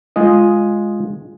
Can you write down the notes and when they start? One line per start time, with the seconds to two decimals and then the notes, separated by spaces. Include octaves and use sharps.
0.16 G#3 F4 G#4 D#5